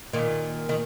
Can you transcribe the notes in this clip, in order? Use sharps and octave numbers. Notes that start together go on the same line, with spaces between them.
A#2 D#3
D#3